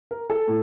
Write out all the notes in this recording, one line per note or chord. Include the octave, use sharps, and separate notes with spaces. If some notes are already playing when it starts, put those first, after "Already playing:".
A#4
A4
A2